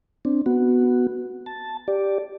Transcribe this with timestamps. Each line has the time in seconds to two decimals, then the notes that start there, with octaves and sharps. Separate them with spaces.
0.25 C4 D4
0.46 B3 F#4
1.46 A5
1.88 G4 D5